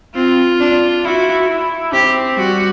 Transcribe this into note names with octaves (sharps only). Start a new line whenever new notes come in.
C4 F4
D4
E4 F#4
E4
C4 G4
G3 F#4